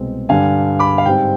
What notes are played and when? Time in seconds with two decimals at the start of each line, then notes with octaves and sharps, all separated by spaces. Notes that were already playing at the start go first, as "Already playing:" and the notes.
Already playing: C2 B2 G#3 C4
0.29 G2 D3 G3 F5 G#5
0.79 B5 D6
0.98 F5
1.05 G#2 G3 C4 G5